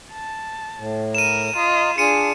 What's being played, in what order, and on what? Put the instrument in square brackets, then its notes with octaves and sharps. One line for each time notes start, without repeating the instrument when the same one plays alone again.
[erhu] A5
[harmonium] A2
[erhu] A#4 [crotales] D#7 E7
[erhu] F4 [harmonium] D#5 A#5
[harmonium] D4 G#4 [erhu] F4 [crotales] C#7 D#7